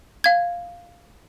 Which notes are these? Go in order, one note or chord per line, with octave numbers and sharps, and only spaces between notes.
F5 G#6